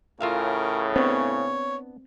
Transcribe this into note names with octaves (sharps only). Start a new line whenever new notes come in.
A2 C#3 F4 A#4 E5 F5
B3 C4 D4 C#5